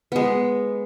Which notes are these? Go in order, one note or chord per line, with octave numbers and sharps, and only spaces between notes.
G#3 B3